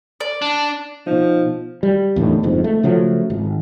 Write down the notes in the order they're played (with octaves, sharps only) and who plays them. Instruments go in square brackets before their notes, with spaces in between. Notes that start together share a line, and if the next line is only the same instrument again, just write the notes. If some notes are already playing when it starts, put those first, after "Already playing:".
[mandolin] D5
[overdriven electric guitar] D4
[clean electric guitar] B2 D#4 [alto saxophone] F3
[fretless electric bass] G3
E2 A2 D3 D#3
F#1 F2 G#2
A3
C#3 F3 F#3 A3
G#1